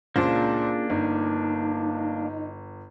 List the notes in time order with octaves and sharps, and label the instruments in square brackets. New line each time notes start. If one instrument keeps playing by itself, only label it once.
[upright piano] C#2 A#2 C5 [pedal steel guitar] A#3 D4 [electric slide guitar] C#4 F4 G#4
[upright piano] G1 [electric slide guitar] D#4